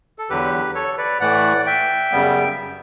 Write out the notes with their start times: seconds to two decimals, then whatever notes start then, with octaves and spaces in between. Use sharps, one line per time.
0.19 A4
0.30 E2 D3 F#3 G4 B4
0.75 A4 C#5
0.98 B4 D5
1.20 A2 E3 A3 D5 F#5
1.67 E5 G5
2.12 F#2 C#3 G3 B3